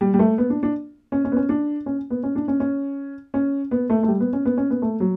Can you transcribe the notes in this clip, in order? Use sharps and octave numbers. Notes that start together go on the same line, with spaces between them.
G3
G3
A3
B3
D4
D4
C#4
C#4
B3
C#4
D4
C#4
B3
C#4
D4
C#4
C#4
C#4
B3
A3
A3
G3
B3
C#4
B3
C#4
B3
A3
F#3